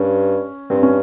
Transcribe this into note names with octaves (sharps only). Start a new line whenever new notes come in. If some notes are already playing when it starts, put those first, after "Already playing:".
Already playing: G2 C#4
G2 C4
C#4